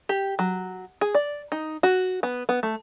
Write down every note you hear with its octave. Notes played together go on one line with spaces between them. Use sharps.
G4
F#3
G#4
D5
D#4
F#4
B3
B3
A3